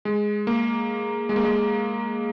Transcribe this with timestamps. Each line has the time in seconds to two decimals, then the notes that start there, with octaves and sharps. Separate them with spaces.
0.05 G#3
0.47 A#3
1.29 G#3
1.36 A#3
1.44 G#3